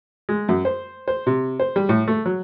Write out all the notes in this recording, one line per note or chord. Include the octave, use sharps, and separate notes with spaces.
G#3
F#2
C5
C5
C3
C5
G3
A2
A3
F#3